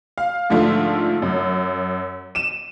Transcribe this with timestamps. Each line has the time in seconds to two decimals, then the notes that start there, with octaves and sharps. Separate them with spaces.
0.18 F5
0.50 G#2 D3 F3 A3 F4
1.22 F#2
2.35 D#7 E7